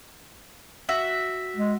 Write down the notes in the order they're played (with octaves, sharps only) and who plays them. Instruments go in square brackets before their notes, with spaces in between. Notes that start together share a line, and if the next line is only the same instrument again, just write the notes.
[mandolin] F#4 E5
[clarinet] G#3